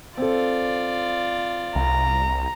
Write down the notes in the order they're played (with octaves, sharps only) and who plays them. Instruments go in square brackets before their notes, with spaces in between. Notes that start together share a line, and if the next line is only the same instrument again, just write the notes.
[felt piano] C4 A4 [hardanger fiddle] F4 D5
[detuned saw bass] C2 [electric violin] A#5